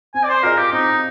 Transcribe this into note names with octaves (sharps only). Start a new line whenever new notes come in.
C4 G#5
D5
C5
F4 G#4 A#4 D#5
G4
C4 D#4